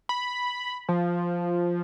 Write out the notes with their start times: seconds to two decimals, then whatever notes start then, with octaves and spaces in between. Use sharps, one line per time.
0.09 B5
0.89 F3